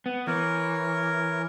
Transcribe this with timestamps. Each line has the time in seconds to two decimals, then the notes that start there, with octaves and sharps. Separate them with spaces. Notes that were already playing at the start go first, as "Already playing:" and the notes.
0.06 B3
0.27 E3 A#4 C#5